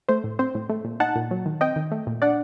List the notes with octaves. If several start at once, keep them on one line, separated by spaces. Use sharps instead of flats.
A3 C5
A2
C4 C5
A2
A3
A#2
D#4 F#5 A5
A#2
F#3
D#3
C4 D#5 G5
D#3
A3
A#2
D4 D5 F#5